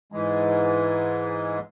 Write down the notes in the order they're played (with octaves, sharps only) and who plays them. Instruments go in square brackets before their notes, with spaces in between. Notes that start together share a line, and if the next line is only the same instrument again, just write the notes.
[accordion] G#2 E3 G#3